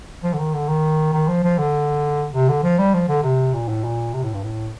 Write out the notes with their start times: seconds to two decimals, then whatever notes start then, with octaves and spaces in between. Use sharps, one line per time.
0.23 F3
0.34 D3
0.39 D#3
0.54 D3
0.68 D#3
1.13 D#3
1.28 F3
1.44 F3
1.58 D3
2.34 C3
2.49 D3
2.63 F3
2.79 G3
2.94 F3
3.09 D3
3.23 C3
3.53 A#2
3.68 A2
3.84 A#2
4.13 C3
4.24 A2
4.34 G2
4.43 A2